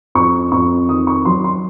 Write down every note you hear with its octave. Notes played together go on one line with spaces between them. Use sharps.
F2 C#6
F2 C#6
D#3 D#6
C#6
F#3 C6
C6